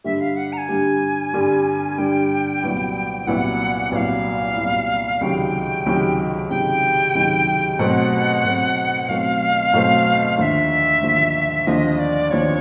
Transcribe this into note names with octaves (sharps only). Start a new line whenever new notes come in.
G2 D3 G3 E5
F5
F#5
A#5
G#5
G2 D3 G3
G2 D3 G3
G2 D3 G3 G5
C2 A#2 F#3 B3 E4
C2 A#2 F#3 B3 E4 F#5
C2 A#2 F#3 B3 E4 F5 F#5
C2 A#2 F#3 B3 E4
C#2 C3 D#3 F#3 G5
C#2 C3 D#3 F#3
C#2 C3 D#3 F#3 G5
C#2 C3 D#3 F#3
B2 F#3 A3 C4 F#5
B2 F#3 A3 C4
B2 F#3 A3 C4 F5
B2 F#3 A3 C4
D#2 D3 F3 E5 F5
D#2 D3 F3
D#2 D3 F3 D#5
D5
D#2 D3 F3 C#5